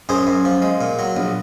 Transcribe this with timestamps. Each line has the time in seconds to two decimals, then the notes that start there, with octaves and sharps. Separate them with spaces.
0.09 F#2 G#4 C5
0.27 F#2
0.45 F3
0.62 G#3
0.81 A#2
0.99 F#3
1.17 A#1